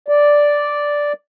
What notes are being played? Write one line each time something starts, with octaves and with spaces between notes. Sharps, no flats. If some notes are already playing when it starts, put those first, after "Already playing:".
D5